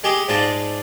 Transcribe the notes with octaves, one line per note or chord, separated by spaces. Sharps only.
G#3 G4 G#4
G#2 G#3 F4 D5 A5